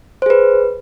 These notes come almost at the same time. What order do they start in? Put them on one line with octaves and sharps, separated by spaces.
C5 G#4 B4